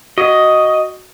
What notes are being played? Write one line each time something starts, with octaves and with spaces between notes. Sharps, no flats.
F#4 D#5